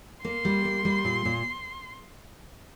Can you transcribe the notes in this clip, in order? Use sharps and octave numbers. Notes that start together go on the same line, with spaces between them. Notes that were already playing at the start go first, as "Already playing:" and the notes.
A#3 C6
G3
A#3
G3
A#2
A#2